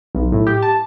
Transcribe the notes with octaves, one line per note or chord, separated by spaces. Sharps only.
B1
A2
G4
A5